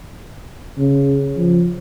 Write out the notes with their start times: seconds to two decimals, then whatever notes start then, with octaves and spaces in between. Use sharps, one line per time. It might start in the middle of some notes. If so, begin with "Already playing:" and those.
0.78 C#3
1.36 F3